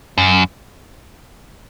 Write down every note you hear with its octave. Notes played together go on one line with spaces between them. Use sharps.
F#2